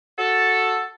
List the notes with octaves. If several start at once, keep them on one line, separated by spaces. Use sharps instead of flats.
F#4 A4